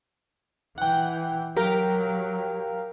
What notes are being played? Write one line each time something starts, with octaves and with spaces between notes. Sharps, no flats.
E3 F#5 G5
F#3 G4 A#4 F5